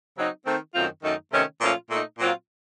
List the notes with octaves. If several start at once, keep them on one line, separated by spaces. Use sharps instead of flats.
C#3 F#3 C4 D#4
D#3 A3 C4
F#2 D#3 A3 C4 F4
F#2 D#3 A3 D#4
C3 D#3 A3 C#4
A#2 F3 A3 C#4 F4
A#2 A3 D#4
A#2 F#3 C4 F4